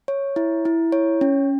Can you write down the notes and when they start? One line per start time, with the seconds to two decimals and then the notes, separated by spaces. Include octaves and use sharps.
0.08 C#5
0.36 E4
0.65 E4
0.92 C#5
1.21 C#4